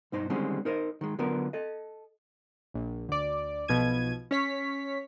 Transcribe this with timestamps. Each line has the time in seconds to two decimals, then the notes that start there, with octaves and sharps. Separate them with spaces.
0.12 B1 G2 D#4 C5 C6
0.30 D3 D#3 G3 G#3 C4 C#4
0.65 D#4 A#4 C5 D#5
1.01 D#3 G#3
1.19 D3 F#3 B3 F4 A#4
1.53 A4 D#5
2.74 A#1
3.08 D2 D5
3.68 B1 B2 F3 G#6 D#7
4.31 C#4 C#5 B6